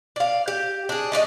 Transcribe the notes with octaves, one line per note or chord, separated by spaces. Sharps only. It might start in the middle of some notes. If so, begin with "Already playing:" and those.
D5 F5
G4
D4 G#4
A3 D4 C#5 D#5